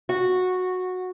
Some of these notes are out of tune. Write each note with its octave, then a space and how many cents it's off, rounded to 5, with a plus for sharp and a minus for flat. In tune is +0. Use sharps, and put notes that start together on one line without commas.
F#4 -10